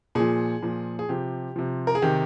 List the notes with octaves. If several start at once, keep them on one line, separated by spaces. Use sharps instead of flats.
A#2 F3 G#4
A#2 F3
G#4
C3 F3 G4
C3 F3
A#4
G#4
C3 D#3 G4